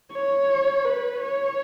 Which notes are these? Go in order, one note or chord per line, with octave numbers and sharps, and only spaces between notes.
C#5
B4
C#5